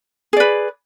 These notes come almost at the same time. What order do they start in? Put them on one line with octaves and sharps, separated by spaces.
G#4 D5 B4